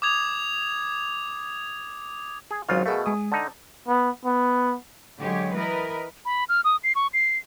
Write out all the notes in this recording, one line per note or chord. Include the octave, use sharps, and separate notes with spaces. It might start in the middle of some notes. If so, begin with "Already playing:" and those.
D6 D#6 G#6 F7
G#4
G#1 C#3 F#3 F4 C5 F6
B2 A3 G#4 A#4 F5
G#3 G#5 D#6
D3 D#4 A5
B3
B3
D3 F#3 G#3 G4 C#5
E3 A#4 B4 D#5
B5
F6
D#6
C7
C#6
C7